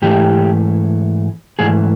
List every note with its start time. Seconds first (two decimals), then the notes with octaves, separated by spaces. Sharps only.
0.02 G#2 E3 A3 G4
1.59 G#2 E3 A3 G#4